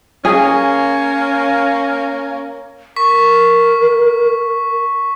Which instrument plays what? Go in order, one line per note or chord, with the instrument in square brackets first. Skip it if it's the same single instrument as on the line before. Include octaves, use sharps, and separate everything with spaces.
[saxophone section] A#3 C#4 [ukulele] G#4
[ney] A#4 [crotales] C#6 B6